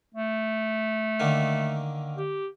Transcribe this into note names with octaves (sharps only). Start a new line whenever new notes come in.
A3
D3 D#3 A#3
G4